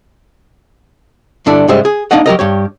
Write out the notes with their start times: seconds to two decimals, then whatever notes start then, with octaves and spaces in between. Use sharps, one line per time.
1.46 G2 D3 D4 E4 A4 D5
1.68 G#2 C#3 G3 G#3 C5 E5
1.85 G#4
2.11 A#3 D4 D#4 D#5 F#5
2.26 F#3 G4 A#4 D#5
2.39 G2 G4 C#5